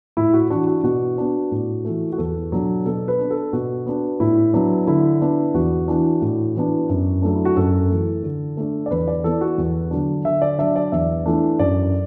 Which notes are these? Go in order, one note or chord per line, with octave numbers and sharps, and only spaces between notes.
A2 E4
F#4
E3 D4 F#4
F#4
B2 F#4
B3 D4
A2
E3 A3
F#4
E2 A4
B2 F#3 D4
B2 A4
B4
B3 D4
A4
B2 F#4
B3 D4
A2 E4
F#3 B3 D4
D3 E4
B3 D4
E2 F#4
E3 D4
A2
E3 B3 D4
F#2
F#3 A3 D4
E4
F#4
F#2 A4
E3 A3
D3
A3 D4
D5
E2 B4
D5
E3 B3 A4
F#4
E2
D3 F#3 D4
D3 E5
D5
F#3 D4 E5
D5
E2 E5
E3 A3 D4
F#2 D5